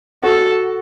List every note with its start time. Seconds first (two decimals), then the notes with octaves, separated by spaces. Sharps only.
0.23 F#4 A4